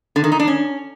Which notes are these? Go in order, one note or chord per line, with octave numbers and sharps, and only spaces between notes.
D3
D#3
D#4
D4
C#4